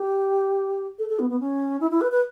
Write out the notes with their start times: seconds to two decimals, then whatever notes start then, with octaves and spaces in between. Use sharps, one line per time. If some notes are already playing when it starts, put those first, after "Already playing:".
Already playing: G4
0.99 A4
1.09 A4
1.19 B3
1.30 B3
1.40 C#4
1.80 E4
1.91 E4
2.01 B4
2.12 B4